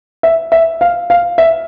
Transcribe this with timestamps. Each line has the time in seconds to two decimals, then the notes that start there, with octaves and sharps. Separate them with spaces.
0.23 E5
0.52 E5
0.81 F5
1.10 F5
1.38 E5